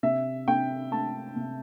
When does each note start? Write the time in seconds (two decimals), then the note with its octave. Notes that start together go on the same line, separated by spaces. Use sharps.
0.03 C3 E5
0.48 C3 G5
0.91 A3 A5
1.36 C3